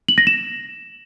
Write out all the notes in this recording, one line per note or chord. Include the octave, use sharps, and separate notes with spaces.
F#7
A#6
E7